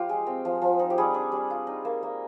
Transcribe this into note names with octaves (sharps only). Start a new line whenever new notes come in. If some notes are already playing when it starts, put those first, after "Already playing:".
Already playing: F3 F4 G4
G#3
C4
F3
F3
D#4
G4
G3 G#4
D4
G3
F4
D#4
A#3
A#3